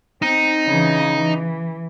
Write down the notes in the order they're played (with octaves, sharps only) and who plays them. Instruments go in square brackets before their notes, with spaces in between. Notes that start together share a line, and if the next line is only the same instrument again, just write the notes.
[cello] C4 [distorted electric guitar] D#4
[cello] C#3 E3
E3